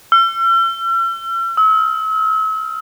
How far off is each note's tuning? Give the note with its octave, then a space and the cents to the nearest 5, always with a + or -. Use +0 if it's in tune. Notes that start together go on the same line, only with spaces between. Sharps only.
E6 +45
E6 -40